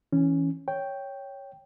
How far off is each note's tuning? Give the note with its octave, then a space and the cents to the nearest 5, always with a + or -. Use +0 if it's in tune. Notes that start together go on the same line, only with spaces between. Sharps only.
E3 -15 C#4 +0
C#5 +0 G5 +0